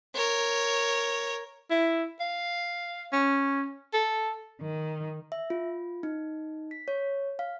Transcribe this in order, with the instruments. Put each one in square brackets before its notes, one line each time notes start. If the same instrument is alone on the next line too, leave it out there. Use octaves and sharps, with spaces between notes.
[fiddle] A#4 C#5
[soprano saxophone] E4
F5
C#4
A4
[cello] D#3
[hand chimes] E5
F4
D#4
B6
C#5
F5